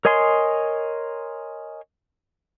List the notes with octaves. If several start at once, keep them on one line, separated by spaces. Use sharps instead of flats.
A#4 C#5 D#5 G#5 C6